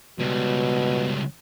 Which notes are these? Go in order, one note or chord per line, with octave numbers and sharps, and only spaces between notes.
C#2 B2 G3